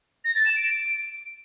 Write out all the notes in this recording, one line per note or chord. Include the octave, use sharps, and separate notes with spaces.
A#6
A6
E7
D7